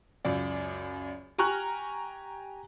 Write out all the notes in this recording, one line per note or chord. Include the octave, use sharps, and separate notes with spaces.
C#2 F#2 D5
G4 G#5 A#5 C#6 F6 F#6